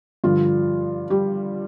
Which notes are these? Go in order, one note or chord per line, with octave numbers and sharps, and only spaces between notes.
G2 D3 F3 F4
G3 G4